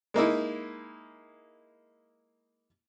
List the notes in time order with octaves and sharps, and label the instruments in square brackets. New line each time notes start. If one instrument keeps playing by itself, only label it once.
[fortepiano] G#3 A#3 D#4 E4